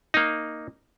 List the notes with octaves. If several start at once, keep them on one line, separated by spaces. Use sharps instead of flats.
A#3 D#4